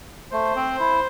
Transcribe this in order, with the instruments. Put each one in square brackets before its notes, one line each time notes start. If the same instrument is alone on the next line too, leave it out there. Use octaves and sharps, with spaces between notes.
[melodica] A3 [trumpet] C5
[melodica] C4
E4